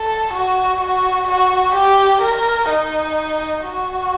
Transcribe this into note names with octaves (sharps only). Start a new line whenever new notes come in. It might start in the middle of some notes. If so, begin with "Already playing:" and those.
Already playing: A4
F#4
F#4
F#4
G4
A#4
D#4
F#4